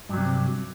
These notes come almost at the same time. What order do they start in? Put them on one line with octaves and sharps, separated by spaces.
G2 F#3 C3